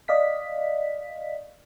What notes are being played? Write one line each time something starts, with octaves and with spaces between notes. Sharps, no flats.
D5 D#5 F5 B6